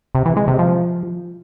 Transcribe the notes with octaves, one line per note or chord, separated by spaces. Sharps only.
C3
E3
G#3
C3
F3